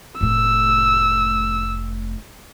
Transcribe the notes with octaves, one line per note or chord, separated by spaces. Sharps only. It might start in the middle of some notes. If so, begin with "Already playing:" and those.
F1 A2 E6